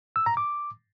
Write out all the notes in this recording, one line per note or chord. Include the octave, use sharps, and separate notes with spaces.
E6
A#5
D6